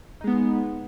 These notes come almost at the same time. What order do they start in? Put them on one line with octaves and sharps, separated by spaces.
D#4 G#3 B3